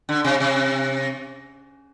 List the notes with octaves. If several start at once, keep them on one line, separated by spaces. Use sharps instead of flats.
D3
C3
C3